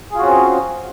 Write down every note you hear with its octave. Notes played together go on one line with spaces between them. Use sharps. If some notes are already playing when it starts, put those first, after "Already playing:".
C4 C#4 F4 F#4 G#4